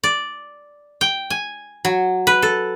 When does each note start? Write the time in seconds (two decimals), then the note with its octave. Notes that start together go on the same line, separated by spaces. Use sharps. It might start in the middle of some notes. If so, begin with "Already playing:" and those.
0.04 D5
1.01 G5
1.30 G#5
1.85 F#3
2.27 B4
2.42 A4